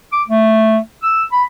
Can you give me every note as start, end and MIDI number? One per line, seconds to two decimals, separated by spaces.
0.12 0.23 86
0.28 0.77 57
1.02 1.23 88
1.32 1.43 83